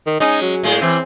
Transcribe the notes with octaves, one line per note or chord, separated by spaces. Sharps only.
D#3
G#3 C#4 D#4
F#3
A2 G#3
E3 C4